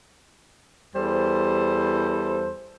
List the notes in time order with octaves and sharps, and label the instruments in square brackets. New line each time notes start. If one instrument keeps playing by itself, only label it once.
[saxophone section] E2 G3 A4 C5